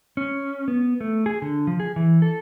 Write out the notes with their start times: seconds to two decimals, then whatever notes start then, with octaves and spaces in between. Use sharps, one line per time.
0.17 C#4
0.68 B3
1.01 A3
1.26 G#4
1.42 D3
1.67 F3
1.80 G#4
1.96 E3
2.22 A4